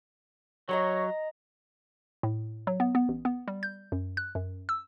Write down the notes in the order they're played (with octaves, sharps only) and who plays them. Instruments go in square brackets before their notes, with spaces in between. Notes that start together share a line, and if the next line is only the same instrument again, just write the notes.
[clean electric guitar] F#3 [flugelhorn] C#5 [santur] D#5 A#5 C6
[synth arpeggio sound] A2
F#3
B3
B3
A1
B3
G3
G6
F#2
F#6
F#2
E6